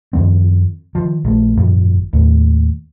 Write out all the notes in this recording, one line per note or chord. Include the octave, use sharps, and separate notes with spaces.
F#2 D#3 F3 C4
D#3 F3
A#1 A3
G#1 F#2 A#2 F3
D#2 A2